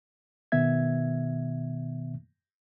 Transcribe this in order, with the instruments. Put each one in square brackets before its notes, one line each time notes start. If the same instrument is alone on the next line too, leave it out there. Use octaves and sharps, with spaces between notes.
[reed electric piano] B2 D#3 B3 E5 G#6